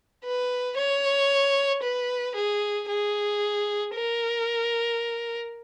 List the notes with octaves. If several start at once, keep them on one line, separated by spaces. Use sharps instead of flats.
B4
C#5
B4
G#4
G#4
A#4